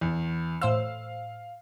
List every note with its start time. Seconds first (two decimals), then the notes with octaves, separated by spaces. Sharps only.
0.01 E2
0.61 A2 C5 F5 E6